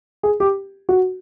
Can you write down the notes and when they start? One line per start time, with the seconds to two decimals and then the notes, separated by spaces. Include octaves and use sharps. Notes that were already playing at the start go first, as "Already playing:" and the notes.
0.23 G#4
0.40 G4
0.89 F#4